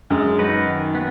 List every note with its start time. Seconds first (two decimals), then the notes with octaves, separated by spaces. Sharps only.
0.10 F#2 G#3
0.39 D#4 F#4 B4
0.67 D#3
0.95 B3